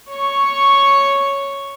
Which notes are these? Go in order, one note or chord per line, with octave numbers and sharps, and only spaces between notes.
C#5 C#6